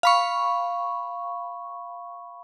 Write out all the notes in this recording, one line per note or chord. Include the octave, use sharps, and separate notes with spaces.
F5 B5 C#6